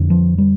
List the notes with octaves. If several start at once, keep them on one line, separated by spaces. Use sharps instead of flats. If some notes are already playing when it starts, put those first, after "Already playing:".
Already playing: F2 D3
F3
G3